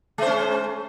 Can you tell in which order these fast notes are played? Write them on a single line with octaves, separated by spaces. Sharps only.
G#3 C5 C#4